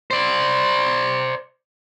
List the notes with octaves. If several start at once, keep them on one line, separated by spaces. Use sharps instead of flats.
C5 D5